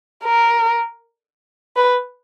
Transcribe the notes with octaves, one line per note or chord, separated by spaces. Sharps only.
A#4
B4